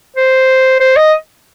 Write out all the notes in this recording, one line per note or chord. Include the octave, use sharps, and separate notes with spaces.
C5
C5
D#5